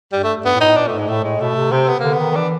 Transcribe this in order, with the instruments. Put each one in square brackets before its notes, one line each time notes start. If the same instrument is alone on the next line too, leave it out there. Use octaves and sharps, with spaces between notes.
[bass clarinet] G2 [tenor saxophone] G3
[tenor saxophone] A3
[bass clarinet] G2 [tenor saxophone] B3
[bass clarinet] A2
[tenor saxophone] D#4
[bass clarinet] A2
[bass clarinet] A#2 [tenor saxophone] D4
[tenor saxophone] A3
[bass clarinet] G#2
[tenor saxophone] G#3
[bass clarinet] A2 [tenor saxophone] A3
[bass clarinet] A2 [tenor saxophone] G#3
[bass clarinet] B2 [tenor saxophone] A3
[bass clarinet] C3
[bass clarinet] C3 [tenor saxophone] C4
[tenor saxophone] B3
[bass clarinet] D3 [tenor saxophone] A#3
[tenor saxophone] B3
[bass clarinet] D#3
D#3
[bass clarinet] E3 [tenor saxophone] D4